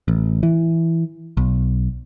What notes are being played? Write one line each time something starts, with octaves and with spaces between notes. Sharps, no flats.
A1
E3
B1